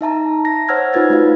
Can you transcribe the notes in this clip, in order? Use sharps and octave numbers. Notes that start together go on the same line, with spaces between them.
D#4 E5 A5 A#5
A#6
C5 C#5 F#5 E6 F6 G#6
D#4 F4 B4 G#6 A6
A3 F#4 F5